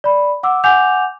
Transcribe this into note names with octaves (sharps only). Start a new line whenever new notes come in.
D5 B5
F#5 D6 E6
F#5 G#5 D6 G6 F7